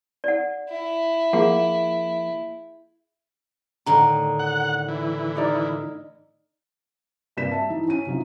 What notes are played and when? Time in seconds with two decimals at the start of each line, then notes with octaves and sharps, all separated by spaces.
0.24 D5 F#5
0.70 E4
1.33 F3 A#3 G#4 F5 F#5
3.86 A2 D3 D#3 A#5
4.39 F#5
4.88 E3
5.35 D#4 A#4 D5
7.37 G2 C3 A#3 F#4 B6 E7
7.51 E5 A5
7.69 E3 D#4 E4
7.88 C#4 D#7
8.06 C3 F#3 D#4 F4